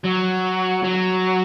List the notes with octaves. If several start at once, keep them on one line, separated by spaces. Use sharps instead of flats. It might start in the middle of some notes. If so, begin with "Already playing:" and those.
F#3
F#3